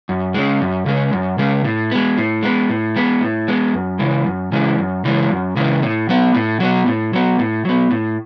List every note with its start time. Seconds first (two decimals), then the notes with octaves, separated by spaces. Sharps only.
0.09 F#2
0.34 C#3 G#3
0.61 F#2
0.86 C#3 G#3
1.13 F#2
1.38 C#3 G#3
1.64 A2
1.91 G#3 B3
2.18 A2
2.43 G#3 B3
2.70 A2
2.96 G#3 B3
3.21 A2
3.48 G#3 B3
3.74 F#2
3.99 C#3 E3 G#3
4.27 F#2
4.52 C#3 E3 G#3
4.78 F#2
5.05 C#3 E3 G#3
5.31 F#2
5.56 C#3 E3 G#3
5.82 A2
6.09 F#3 B3
6.35 A2
6.60 F#3 B3
6.86 A2
7.13 F#3 B3
7.39 A2
7.65 F#3 B3
7.91 A2